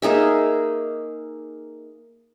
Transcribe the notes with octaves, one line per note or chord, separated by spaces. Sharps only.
A#3 D#4 G#4 E5